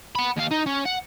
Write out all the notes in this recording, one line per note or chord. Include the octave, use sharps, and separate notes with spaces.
F#5 B5
D#2 F5
D#4
C#4
F#5